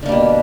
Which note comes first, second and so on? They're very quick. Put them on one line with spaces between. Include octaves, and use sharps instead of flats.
D3 A#3 G3 B2